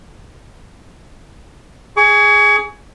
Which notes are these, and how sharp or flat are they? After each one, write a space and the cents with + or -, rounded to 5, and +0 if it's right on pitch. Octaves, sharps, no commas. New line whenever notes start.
G#4 +0 C#6 +35